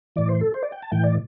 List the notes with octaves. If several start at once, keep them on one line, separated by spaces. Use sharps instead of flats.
A2 E3 D5
C5
A4
C5
D5
G5
A5
A2 E3 G5
D5